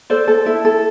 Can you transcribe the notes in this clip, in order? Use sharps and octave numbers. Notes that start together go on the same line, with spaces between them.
A4 C5 D5
A4
E4
A4